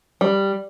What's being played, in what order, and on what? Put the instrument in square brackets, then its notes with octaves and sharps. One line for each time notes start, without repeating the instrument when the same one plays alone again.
[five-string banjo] G3